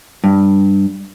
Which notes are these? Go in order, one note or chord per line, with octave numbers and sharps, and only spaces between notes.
G2